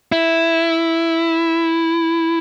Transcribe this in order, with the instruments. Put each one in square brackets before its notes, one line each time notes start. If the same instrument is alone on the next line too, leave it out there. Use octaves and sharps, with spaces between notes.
[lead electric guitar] E4